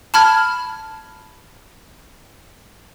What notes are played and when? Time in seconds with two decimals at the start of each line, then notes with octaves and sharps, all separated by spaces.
0.14 A5 B5 F6 G#6